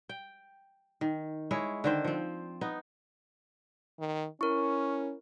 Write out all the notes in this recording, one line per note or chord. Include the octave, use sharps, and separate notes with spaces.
G5
D#3
G#3 E4 C#5
D3 D#3 C5
F3 C4
B3 D#4
D#3
C#4 E4 A#4 C#6